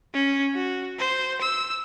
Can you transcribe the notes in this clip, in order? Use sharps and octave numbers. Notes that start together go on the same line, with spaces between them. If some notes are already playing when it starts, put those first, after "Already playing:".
C#4
F#4
C5
E6